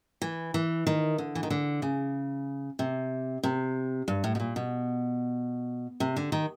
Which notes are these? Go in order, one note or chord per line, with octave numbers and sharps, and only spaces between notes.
E3
E3
D#3
D3
E3
D#3
D3
C#3
C3
C3
G2
A2
B2
A#2
B2
C3
D3
D#3